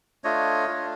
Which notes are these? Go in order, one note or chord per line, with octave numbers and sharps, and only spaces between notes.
A3 D4 F4 C#5 D#5
A3 D4 F4